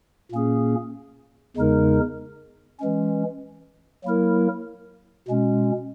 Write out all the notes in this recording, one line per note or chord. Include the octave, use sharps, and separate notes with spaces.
A#2 A#3 C#4 G#4
E2 C#3 G#3 D#4 A#4
E3 G#3 C#4
F#3 A#3 E4 A#4
B2 G#3 C#4